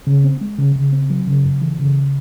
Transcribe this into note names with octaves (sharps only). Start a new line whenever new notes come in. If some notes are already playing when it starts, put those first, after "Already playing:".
C#3
C4
G#3
C#3
C#3
C4
F#3
C#3
F#2
E3
C#3